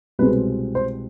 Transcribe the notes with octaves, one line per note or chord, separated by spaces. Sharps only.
C2 B2 G#3 C4 B4
C5